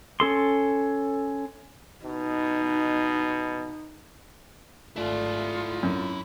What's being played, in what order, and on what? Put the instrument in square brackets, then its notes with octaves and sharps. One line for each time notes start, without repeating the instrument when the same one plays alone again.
[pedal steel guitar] C#4 A4 C6
[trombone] B2 [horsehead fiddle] D#4
[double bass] G#1 A3 [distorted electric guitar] E4 D5 [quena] F4
[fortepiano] F#2